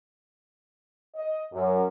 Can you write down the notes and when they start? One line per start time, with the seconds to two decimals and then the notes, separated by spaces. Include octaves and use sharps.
1.16 D#5
1.53 F#2